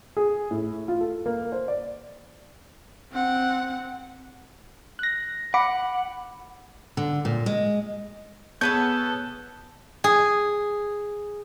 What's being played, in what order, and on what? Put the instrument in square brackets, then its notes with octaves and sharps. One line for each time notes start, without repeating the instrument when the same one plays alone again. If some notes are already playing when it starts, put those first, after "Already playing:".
[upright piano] G#4
A2
F4
A4
A#3
C5
D5
[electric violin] C4 F#5
[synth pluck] F#6 A#6
[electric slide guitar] F#5 [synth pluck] B5 D6
[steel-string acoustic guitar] D3
A#2
G#3
[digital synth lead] B3 [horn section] G#4 A5 [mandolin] A4 B4 C#5 [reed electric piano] G6
[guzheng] G#4